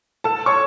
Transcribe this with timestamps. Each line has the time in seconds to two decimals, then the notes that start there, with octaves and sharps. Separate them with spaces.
0.24 A4 A5
0.46 C#5 C#6